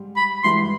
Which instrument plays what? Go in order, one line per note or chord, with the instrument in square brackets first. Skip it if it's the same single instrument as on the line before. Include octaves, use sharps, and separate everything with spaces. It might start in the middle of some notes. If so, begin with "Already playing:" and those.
Already playing: [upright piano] G#2 G3
[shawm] B5
[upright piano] G#2 E3 G3 [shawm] C6